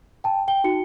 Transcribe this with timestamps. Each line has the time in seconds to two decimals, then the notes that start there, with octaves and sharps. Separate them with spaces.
0.24 G5 A5
0.48 G5 G7
0.64 D#4 F#4 C#7